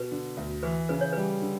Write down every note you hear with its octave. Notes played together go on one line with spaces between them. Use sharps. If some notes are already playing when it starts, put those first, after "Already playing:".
Already playing: B2 B4
D3
D2
E3 B4
C#3 B4
C#5
G3 B4
D3